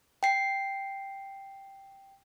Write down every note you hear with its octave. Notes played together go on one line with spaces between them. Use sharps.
G5 C7